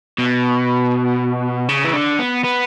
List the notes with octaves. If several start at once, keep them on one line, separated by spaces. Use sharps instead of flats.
B2
C#3
E3
D3
B3
B3